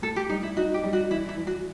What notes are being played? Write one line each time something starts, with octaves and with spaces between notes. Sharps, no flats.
A2 A4
G4
G3 D#4
E4
D#4 F#4
G4
G3
F#4
E3 E4
E4
E3
F#4